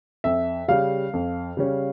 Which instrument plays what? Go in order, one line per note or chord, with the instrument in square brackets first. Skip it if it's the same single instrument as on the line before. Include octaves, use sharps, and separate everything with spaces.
[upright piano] F2 E5
C#3 G3 C#4 F5
F2
C#3 G3 C#4